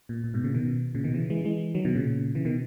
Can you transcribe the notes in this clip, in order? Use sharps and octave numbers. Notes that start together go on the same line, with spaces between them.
A#2
A#2
G#2 B2
A#2 C#3
B2 D#3
A#2 C#3
B2 D#3
C#3 E3
E3 G#3
E3 G#3
D#3 F#3
B2 D#3
A#2 C#3
C#3 E3
B2 D#3